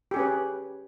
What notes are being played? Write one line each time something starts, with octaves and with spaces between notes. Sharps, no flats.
C#4 G4 G#4 B4